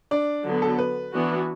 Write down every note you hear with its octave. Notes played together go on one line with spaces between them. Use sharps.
D4 D5
D3 F#3 B3
A4
B4
E3 B3 D4 F#4